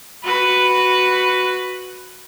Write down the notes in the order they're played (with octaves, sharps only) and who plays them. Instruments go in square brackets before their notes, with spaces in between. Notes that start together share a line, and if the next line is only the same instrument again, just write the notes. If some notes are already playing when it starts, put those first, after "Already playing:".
[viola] F#4 B4